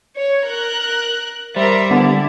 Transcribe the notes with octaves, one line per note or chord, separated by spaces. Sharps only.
C#5
A#4 F#6
G3 A#4 C5 E5
D3 B3 E4